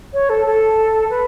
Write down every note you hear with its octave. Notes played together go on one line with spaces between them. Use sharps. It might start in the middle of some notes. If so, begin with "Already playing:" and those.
C#5
A4
A4
B4